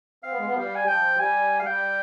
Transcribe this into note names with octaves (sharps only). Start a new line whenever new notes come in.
C4 F5
B3
G#3
B3
F3
G3 F5
G#5
F3 G5
G3 G#5
F5
G3 G5